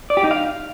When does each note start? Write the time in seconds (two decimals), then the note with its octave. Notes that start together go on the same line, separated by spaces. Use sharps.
0.10 D5
0.17 G4
0.24 D#4
0.31 F5